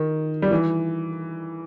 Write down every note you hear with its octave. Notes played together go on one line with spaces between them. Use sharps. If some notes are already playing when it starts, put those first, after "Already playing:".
Already playing: D#3
G3
E3